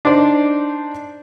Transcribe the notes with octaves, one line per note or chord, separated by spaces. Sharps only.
D4 D#4 C5 D5